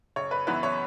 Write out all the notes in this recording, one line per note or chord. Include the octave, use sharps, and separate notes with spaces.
F#1 C#5
B4
F#2 E3 B3 E4 B4
C#5